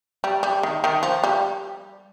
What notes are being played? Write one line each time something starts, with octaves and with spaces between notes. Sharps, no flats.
G3
G3
D#3
D#3
F3
G3